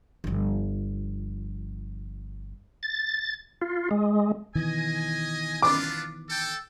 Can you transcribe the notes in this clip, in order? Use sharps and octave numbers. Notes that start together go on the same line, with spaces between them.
G1 F3
A6
F4
G#3
B2 D#3 E3 D#5 G#5
B3 D4 F4 D6
A4 G5